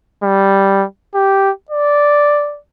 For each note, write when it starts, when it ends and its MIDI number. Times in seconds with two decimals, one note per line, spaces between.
0.23 0.84 55
1.15 1.50 67
1.70 2.58 74